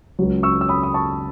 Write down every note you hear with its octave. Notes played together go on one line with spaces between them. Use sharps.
C#2 C#3 F#3
C#6 E6
E6
B5 D#6
D#6
A5 C#6